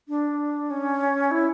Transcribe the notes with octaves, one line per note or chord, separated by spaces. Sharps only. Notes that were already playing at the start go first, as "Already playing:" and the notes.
D4
C#4
E4